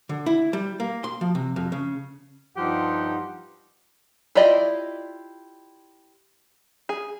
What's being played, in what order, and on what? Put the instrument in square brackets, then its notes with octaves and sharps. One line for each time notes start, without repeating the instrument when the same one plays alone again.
[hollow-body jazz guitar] D3
E4
G3
A#3
C6
F3
C3
F2
C#3
[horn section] G2 F3 D#4 G4 F#5 C6
[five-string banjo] E4 F4 G4 D5 D#5
G#4